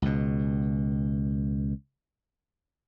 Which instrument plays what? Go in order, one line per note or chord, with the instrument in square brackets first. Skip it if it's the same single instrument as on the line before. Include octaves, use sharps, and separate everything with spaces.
[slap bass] C#2 B2